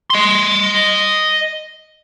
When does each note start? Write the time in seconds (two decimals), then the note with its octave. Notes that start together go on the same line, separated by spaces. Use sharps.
0.10 D#5 C6